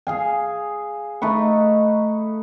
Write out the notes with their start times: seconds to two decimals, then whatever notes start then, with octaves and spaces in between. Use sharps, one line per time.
0.07 G#4 F5 G#5
1.22 A3 D#4 B4 C#6